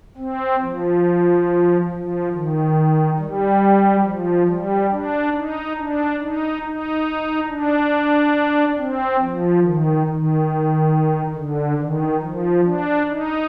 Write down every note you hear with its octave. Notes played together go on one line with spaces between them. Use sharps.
C4
F3
F3
D#3
G3
F3
G3
D4
D#4
D4
D#4
D#4
D4
C4
F3
D#3
D#3
D3
D#3
F3
D4
D#4